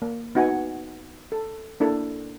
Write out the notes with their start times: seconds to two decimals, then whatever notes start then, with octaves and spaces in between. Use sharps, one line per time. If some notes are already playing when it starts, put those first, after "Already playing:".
0.02 A#3
0.35 B3 D#4 F#4 E5 F#5 G#5
1.32 A4
1.80 A#3 D4 E4 A4